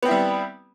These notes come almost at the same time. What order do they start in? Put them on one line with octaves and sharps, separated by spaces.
B3 C4 E4 G3